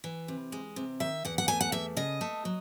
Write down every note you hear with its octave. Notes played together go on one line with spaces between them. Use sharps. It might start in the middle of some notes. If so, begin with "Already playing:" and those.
E3
C3
G#3
C3
D#3 E5
E2 F#5
F#5
A3 G#5
F#5
E2 E5
C#3 D#5
A3
F#3